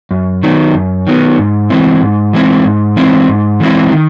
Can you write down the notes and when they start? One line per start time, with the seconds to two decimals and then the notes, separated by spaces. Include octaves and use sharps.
0.11 F#2
0.43 D#3 F#3 B3
0.75 F#2
1.07 D#3 F#3 B3
1.39 G#2
1.70 E3 G#3 C4 E4
2.02 G#2
2.33 E3 G#3 C4 E4
2.65 G#2
2.96 E3 G#3 C4 E4
3.28 G#2
3.60 E3 G#3 C4 E4
3.92 D#3